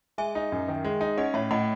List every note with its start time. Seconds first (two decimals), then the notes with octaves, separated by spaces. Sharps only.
0.18 G#3 E5 G#5
0.35 D#4
0.52 F#2
0.68 D#3
0.85 G#3
1.01 D#4
1.18 C#4 D#5 F#5
1.34 A2 C#5 E5
1.51 A2 D#5 F#5